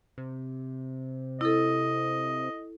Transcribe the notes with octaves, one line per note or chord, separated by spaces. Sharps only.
C3
E4 A4 D#5